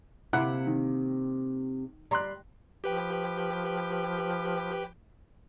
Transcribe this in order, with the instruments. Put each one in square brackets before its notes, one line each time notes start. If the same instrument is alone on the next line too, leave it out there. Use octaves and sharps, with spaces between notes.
[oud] C3 A#3 [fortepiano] E4 F#5 F#6
[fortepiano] D#3
[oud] G3 [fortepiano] A#5 C6 F#6
[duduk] F3 [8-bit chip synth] G4 B4 G5